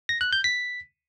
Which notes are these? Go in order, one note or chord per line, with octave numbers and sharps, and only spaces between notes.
A#6
F#6
G6
B6